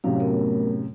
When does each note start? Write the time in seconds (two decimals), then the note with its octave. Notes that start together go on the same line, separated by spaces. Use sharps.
0.04 F#2 A2 C3 F5
0.20 A3 B3 A#4